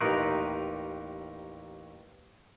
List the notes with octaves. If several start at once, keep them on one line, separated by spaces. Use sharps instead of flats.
A1 D#2 D#4 A#4 B4